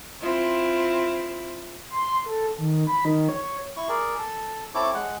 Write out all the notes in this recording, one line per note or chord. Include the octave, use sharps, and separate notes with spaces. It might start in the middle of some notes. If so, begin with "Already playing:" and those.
C4 E4 F4
C6
A4
D#3
B5
D#3
C#5
E4 C#6
G#4 A#4 D5
A4
C4 E4 A4 C#5 D6
G#3 F#5